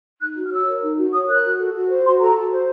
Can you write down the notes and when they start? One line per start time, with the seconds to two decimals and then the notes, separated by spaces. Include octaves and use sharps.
0.21 D#4 F#6
0.36 F#4
0.45 F6
0.52 C#5 E6
0.66 A#4
0.82 D#4
0.97 F#4
1.13 C#5 D#6
1.28 A#4 F#6
1.43 F#4
1.59 A4
1.73 F#4
1.89 C5
2.04 F#4 C6
2.20 A4 A#5
2.35 F#4
2.51 C5